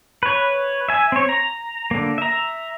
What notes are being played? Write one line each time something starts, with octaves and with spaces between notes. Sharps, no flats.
B4 C#5
E5 G#5
C4 C#5
A#5
D3 A#3
E5 A#5